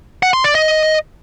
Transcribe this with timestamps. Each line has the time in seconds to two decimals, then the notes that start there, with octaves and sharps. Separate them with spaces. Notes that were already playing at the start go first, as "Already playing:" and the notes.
0.23 F#5
0.33 C6
0.44 D5
0.55 D#5